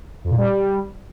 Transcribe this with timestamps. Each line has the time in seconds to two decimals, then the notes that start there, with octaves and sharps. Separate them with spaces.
0.24 F2
0.31 A#2
0.37 G3